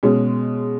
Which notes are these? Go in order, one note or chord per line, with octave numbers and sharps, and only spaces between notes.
B2 G#3 C#4